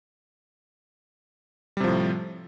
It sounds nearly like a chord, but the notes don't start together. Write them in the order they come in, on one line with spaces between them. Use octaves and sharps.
G3 C3 F3 A2